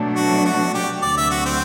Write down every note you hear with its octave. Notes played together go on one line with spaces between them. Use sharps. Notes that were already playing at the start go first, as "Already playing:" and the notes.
Already playing: B2 F#3 A3 D4
F#4
F#4
G4
D2 C3 F#3 D5
E5
F#4
C4